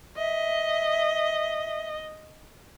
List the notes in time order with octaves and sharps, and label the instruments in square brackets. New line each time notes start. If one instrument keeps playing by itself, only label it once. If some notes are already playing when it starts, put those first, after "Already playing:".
[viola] D#5 [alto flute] E5